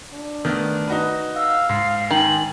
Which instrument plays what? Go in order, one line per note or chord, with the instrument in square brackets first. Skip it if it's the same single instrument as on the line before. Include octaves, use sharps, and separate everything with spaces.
[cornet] D4
[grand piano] D#3 A3 B3
D#4 F#4 B4
[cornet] F5 [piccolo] E6
[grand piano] G#2 [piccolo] C7
[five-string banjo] D#3 [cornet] G#5 [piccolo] F#7